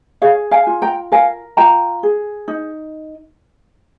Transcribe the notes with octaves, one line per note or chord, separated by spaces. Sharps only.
G#4 C#5 F5
F5 G#5
F4
G5 A#5
A#4 F5 G#5
F4 G5 A#5
G#4
D#4